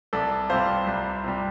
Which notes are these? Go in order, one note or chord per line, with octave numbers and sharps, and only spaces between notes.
C2 A4 D5
C3 G3 C5 F5
C2
C3 G3